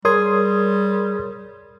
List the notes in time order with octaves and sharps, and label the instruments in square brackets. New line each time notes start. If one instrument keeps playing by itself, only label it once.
[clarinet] G3 [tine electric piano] G#4 D#6 G#6 [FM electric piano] A#4 C#5 C6